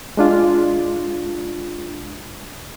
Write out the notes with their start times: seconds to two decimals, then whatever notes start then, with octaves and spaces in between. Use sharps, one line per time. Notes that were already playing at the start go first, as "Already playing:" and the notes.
0.17 G#3 D4 F4